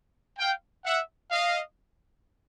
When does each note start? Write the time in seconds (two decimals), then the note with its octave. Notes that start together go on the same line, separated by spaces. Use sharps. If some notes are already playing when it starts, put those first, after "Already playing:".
0.38 F5 G5
0.85 E5 F#5
1.31 D#5 F5